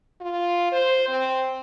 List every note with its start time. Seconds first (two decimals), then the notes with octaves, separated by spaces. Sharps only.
0.21 F4
0.72 C5
1.08 C4